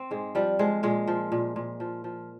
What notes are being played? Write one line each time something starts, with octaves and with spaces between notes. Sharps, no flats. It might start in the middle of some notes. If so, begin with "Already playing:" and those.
Already playing: C4
G#2 G#3
F3 G3
F3 G#3
A#2 G#3
F3
A#2
A#2
F3
F3